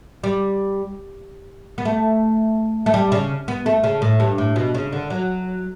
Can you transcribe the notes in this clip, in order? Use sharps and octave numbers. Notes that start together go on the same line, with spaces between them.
G3
B3
A3
A3
G3
C#3
B3
A3
C#3
A2
G2
A2
B2
C#3
D3
F#3